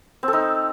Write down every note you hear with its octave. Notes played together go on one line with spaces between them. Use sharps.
C4
A4
D#4